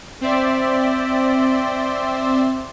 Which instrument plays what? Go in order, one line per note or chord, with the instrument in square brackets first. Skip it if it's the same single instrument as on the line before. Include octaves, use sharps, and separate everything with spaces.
[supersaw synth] C4 C5 D5 E5